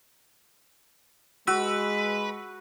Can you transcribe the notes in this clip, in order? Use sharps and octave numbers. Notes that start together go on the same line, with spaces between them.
G#3 F#4 B4 E6